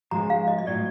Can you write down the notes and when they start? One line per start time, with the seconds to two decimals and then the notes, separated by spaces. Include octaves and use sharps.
0.11 G#2 F3 G#3 A#5
0.30 F5
0.48 D#5
0.59 D#5
0.66 A2 F#3 D5